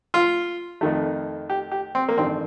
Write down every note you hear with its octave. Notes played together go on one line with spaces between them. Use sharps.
F4
F2 D#3 A3
G4
G4
C4
A#3
A1 G2 D#3 A3 C4